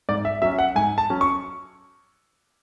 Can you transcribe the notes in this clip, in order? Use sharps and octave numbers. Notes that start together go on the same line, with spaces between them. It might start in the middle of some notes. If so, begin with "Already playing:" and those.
G#2 D5
E5
F#3 C#4 E5
F#5
G#2 G#5
A5
F#3 C#4
C#6